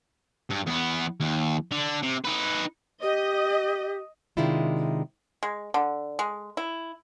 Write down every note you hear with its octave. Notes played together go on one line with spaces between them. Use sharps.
G2
E2 B3
D#2
D3
C3
D#4 B4
G4 D#5
C3 D#3 G#3 D4 E4 F4
G#3
D3
G#3
E4